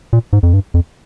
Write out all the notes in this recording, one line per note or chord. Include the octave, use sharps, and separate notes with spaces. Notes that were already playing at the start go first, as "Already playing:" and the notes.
A#2
G#2
F2
G2
F2